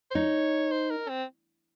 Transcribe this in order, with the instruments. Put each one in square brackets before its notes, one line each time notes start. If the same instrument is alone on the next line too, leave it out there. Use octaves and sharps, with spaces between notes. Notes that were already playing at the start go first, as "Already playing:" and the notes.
[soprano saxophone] C5
[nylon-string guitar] D#4 [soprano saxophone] C#5
[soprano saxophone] C5
A#4
C4